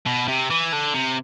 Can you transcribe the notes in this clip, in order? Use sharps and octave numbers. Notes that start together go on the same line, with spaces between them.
B2
C3
E3
D3
C3